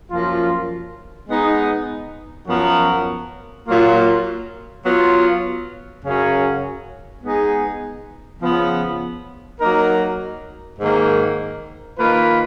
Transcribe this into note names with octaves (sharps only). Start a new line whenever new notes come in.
F#2 F3 A#3 F4
G#3 B3 D#4
F#2 F3 B3 F#4 A#4
A#2 F#3 A#3 F4
F#3 B3 F4
F#2 C#3 F#3 C#4
G#3 B3 D#4 G#4
C#3 F3 B3
F#3 A#3 D#4 A#4
G#2 D#3 A#3
D#3 A#3 F4 B4